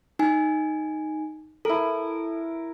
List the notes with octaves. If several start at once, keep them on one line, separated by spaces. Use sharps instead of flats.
D#4 G#5
E4 A4 A#4